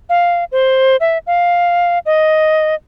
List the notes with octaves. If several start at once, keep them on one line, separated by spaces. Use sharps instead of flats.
F5
C5
E5
F5
D#5